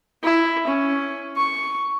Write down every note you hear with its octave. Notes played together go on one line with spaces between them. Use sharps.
E4
C#4
C#6